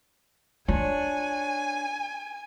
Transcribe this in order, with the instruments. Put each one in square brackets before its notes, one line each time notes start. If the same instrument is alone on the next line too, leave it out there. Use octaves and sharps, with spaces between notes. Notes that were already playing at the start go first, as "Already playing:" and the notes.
[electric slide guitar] D4 C#5 [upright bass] F4 [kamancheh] G#5